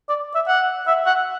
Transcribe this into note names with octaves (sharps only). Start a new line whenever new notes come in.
D5
E5
F#5
E5
F#5